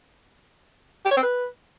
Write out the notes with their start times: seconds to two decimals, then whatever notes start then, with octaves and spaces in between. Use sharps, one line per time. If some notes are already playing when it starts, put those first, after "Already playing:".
1.05 G4
1.11 C#5
1.17 C4
1.23 B4